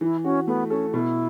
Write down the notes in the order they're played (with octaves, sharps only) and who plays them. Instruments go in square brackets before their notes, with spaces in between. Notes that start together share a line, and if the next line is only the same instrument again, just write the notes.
[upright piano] E3 [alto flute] E4
[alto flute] C#4 [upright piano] F#4
[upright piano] A3 [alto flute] B3
[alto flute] C#4 [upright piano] A4
[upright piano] B2 [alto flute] E4